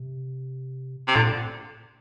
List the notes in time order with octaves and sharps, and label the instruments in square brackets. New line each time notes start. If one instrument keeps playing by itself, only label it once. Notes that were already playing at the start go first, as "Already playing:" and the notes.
Already playing: [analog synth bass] C3
[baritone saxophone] C3
[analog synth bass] A#2 [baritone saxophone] D3